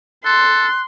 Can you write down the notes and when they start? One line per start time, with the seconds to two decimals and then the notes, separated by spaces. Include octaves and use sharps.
0.25 A4 C6 F#6